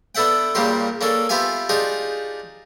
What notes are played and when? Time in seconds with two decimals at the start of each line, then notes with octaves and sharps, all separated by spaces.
0.15 B3 D4 A4 E5 F#5 G5
0.55 A#2 C#3 G3 A#3 G4 C6
1.01 A#3 C#4 D4 A4
1.29 B3 F4 G4 E5 F5 G#5
1.69 D4 D#4 F4 G4 G#4